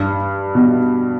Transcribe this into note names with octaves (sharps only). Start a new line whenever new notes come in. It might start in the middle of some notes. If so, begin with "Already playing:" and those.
Already playing: G2
B2